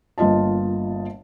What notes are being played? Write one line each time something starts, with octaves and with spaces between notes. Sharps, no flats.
G1 A#3 F4 D#5 A5